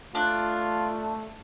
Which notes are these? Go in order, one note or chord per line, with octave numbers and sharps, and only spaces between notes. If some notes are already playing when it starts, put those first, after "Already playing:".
A3 D4 F4 F#6